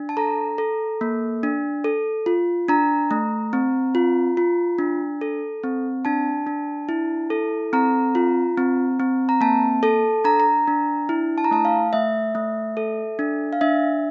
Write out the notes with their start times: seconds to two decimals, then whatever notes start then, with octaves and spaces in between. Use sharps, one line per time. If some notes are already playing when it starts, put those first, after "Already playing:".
Already playing: D4
0.09 A5
0.17 A4 A#5
0.58 A4
1.01 A#3
1.43 D4
1.84 A4
2.26 F4
2.68 D4 A#5
3.11 A3
3.53 C4
3.95 F4
4.37 F4
4.79 D4
5.21 A4
5.63 C4
6.05 D4 A5
6.47 D4
6.89 E4
7.30 A4
7.73 C4 A#5
8.15 F4
8.58 C4
9.00 C4
9.29 A#5
9.41 A#3 A5
9.83 A4 A5
10.24 D4 A#5
10.40 A#5
10.68 D4
11.09 E4
11.38 A5
11.44 A#5
11.51 A3 A5
11.65 F5
11.93 A3 E5
12.35 A3
12.77 A4
13.19 D4
13.53 F5
13.61 D4 E5